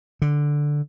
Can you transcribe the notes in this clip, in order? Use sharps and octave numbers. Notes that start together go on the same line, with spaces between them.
D3